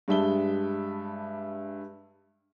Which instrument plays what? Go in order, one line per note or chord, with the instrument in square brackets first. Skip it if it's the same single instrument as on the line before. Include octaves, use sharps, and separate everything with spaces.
[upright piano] G2 G3 G#3 E5 A5 G7